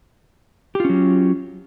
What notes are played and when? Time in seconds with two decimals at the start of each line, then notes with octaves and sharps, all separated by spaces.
0.75 G4
0.80 F4
0.85 C#4
0.89 F#3